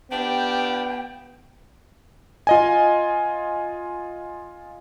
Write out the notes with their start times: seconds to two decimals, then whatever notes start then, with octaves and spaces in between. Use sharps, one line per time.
0.11 B3 D4 F4 G4 G5
2.47 F4 D#5 G#5